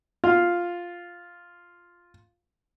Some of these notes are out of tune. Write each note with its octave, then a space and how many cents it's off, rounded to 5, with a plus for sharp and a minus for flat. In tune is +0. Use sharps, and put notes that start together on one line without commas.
F4 +0 F5 +0